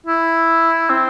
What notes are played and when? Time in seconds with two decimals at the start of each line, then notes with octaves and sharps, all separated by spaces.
0.06 E4
0.90 C4